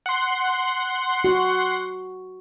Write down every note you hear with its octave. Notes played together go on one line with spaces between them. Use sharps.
F#5 C6
F#4